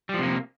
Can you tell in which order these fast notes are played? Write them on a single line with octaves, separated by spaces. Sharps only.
G3 F3 C3 A#3